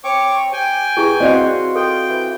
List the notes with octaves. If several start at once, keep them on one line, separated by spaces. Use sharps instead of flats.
C4 C#5 C#6 D6
G4 G5 G#5
E2 E4 G4 G#4
C4 F#4 D5 D#5 F5
F4 A4 G5
E3